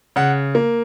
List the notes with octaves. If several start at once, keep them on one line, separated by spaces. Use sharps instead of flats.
C#3 F#5
A#3